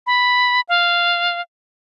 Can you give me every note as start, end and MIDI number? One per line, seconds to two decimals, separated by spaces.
0.07 0.61 83
0.69 1.41 77